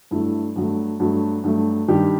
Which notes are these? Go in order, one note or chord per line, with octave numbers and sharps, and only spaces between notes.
G2 F#3 A3 E4
G2 F#3 A3
G2 F#3 A3 F#4
G2 F#3 A3
G2 D#3 G3 G4